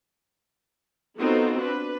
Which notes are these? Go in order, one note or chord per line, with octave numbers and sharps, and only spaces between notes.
B3 C4 D#4 F4 F#4 A4
D4 B4